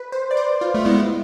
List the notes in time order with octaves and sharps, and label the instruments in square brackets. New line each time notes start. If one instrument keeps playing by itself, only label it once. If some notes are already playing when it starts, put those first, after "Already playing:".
Already playing: [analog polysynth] B4
C5
D5
C5
F4
[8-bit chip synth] A3
[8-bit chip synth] G#3 B3 [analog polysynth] E4